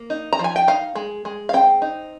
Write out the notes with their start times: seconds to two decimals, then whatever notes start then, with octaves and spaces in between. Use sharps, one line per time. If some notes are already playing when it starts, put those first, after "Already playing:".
Already playing: A#3
0.10 D#4
0.33 A#5
0.39 F3
0.44 G#5
0.56 G5
0.68 D#4 F5
0.95 G#3
1.25 G#3
1.49 F5
1.53 C4 G5
1.82 D#4